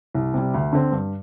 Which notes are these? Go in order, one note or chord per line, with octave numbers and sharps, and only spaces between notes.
C2
C3 G3
D2
D3 C4
G2